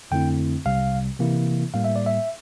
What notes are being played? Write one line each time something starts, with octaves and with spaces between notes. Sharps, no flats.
F2 D3 A3 C4 E4 G5
C2 C3 G3 F5
C3 E3 A#3 E4
A2 G3 A#3 F5
E5
D5
E5